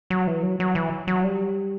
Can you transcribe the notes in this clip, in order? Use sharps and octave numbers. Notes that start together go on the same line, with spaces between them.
F#3
E3
F#3
F#3
E3
F#3
G3